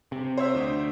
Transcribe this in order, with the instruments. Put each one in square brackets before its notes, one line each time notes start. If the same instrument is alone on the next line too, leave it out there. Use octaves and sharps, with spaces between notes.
[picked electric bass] C3
[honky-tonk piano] C5 C#5 E5
[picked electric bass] D2